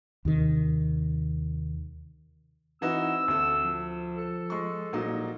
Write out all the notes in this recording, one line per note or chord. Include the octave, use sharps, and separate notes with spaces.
D#2 C3 D#3
E3 C4 D#4 F#4 E6
D2 A4
F3
A4
G#3 C#6
A#1 A#2 F#3 D#4